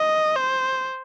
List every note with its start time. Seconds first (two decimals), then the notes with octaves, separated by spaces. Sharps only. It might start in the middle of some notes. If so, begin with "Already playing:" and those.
Already playing: D#5
0.36 C5